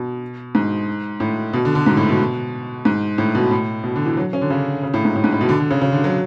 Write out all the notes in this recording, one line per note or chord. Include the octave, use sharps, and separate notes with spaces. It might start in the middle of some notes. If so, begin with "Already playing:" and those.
Already playing: B2
G#2
A2
B2
D3
D3
G#2
A2
B2
G#2
A2
B2
A2
B2
D3
E3
F#3
C#4
D3
C#3
C#3
A2
G#2
A2
G#2
A2
B2
D3
D3
C#3
C#3
D3
F#3